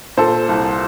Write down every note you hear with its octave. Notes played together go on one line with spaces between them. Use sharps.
A#2 A4 C5
C2